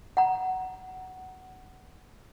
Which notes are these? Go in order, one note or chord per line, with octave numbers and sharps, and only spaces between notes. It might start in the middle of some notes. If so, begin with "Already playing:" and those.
F#5 A#5